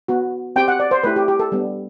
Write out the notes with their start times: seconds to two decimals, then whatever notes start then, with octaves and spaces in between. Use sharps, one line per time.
0.08 B3 F#4
0.56 C4 G4 G5
0.68 F#5
0.80 D5
0.91 C5
1.04 A3 E4 G4 B4
1.16 G4
1.28 G4
1.39 A4
1.52 G3 B3 D4